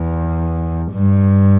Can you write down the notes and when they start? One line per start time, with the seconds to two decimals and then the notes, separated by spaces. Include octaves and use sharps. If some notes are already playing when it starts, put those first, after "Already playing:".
Already playing: E2
0.92 G2